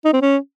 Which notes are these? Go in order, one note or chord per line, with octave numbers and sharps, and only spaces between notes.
D#4
C4
C#4